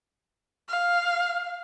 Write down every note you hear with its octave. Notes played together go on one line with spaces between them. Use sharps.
F5